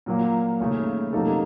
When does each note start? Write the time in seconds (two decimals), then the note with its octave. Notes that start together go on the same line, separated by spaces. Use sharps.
0.06 A#2 F#3 A#3
0.60 D#2 C#3 A3 C#4
1.13 C3 F#3 A#3 D#4 A4